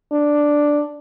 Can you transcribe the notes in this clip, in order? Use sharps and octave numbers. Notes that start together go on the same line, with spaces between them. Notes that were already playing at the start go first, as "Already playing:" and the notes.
D4